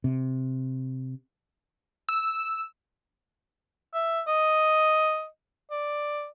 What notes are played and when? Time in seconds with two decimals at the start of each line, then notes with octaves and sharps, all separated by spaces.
0.04 C3
2.09 E6
3.94 E5
4.27 D#5
5.71 D5